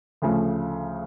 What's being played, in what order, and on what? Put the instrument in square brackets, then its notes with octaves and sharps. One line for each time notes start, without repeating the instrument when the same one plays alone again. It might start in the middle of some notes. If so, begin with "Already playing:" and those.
[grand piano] D2 C#3 F3 A3